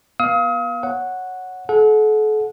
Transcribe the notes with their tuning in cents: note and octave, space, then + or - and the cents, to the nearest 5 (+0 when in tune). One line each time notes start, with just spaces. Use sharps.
B3 -30 F5 +0 D#6 +40
C#5 +0 F#5 -5
A4 -40 F#5 -25